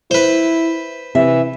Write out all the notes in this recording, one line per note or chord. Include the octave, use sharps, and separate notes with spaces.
E4 B4 C5
C3 E3 E5